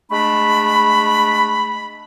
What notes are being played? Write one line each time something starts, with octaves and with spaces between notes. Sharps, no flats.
G#3 A3 D4 B5